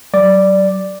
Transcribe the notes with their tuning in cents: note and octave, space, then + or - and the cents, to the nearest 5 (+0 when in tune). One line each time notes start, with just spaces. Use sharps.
F#3 +40 D5 +0